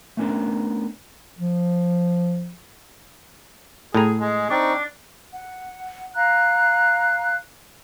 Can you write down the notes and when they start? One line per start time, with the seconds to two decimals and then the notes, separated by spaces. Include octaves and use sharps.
0.17 A3 B3 C#4 D4 A#4
1.38 F3
3.94 A2 G#4 A#5
4.21 G#3 G#4
4.50 C4 D4 D#4 C#6
5.32 F#5
6.16 F5 A#5 F#6